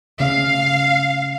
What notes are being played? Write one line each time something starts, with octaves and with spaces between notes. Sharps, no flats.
C#3 F5